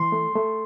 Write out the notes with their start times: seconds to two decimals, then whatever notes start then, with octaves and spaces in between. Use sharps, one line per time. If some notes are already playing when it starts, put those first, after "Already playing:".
Already playing: E3 C6
0.12 A3
0.35 A3